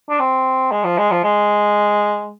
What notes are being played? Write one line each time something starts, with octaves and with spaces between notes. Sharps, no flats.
D4
C4
G#3
F3
G#3
F3
G#3